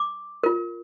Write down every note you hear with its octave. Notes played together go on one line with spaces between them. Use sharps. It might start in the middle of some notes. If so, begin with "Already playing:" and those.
Already playing: D6
F4 A#4